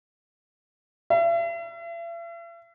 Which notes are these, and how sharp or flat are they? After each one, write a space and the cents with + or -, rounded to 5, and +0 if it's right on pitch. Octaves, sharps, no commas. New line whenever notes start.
E5 +45